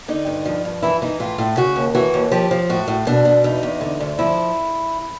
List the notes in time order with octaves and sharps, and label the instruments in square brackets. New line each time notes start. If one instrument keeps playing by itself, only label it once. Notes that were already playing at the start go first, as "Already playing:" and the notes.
[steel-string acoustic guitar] D3 D#4
G2
F3
G2
E3 E4
E3 D#4
A2 F4
A2
C#3 F#4
D#2
E3 F#4
D#2
F3 G4
F3
A2 F#4
A2
B2 D4
B2
E2 D#4
E2
D3
D2
F3 E4